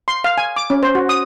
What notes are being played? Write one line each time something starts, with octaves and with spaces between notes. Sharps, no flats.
C6
F5
G#5
D6
C#4
C5
F#4
D#6